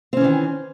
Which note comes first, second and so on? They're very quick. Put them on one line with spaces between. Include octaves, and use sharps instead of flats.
C4 C#4 E3 D#3